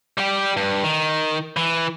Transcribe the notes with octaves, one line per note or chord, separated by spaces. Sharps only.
G3 G4
G2
D#3
E3